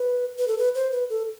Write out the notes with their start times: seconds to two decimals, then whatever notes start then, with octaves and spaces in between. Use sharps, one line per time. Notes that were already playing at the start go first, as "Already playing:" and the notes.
Already playing: B4
0.38 B4
0.48 A4
0.58 B4
0.75 C5
0.92 B4
1.10 A4